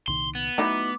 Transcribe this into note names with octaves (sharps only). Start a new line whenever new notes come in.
C2 A#2 D#3 C6
B3
F#3 A3 D#4 E4 D6